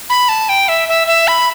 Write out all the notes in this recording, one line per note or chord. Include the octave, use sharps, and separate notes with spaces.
B5
A5
G5
E5
E5
E5
B5